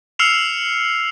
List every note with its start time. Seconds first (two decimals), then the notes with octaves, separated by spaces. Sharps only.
0.19 E6 F6 C7 C#7 E7 F7